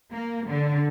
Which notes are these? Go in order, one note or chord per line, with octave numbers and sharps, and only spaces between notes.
A#3
D3